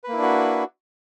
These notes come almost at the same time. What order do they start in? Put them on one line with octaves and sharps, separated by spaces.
B4 A#3 E4 D4 F#4